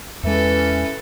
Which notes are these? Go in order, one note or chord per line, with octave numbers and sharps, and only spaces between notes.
E2 E3 G#3 C#4 A4 B4